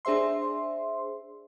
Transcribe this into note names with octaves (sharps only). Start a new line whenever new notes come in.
D4 G#4 C5 E5 C6